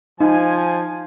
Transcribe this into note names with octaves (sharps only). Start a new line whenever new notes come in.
F3 D#4 G#5